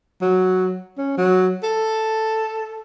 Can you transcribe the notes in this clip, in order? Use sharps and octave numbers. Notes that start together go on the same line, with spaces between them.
F#3
C#4
F#3
A4